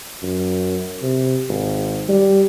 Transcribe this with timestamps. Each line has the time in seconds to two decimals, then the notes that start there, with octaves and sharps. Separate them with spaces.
0.23 F#2
1.02 C3
1.49 G#1
2.09 G3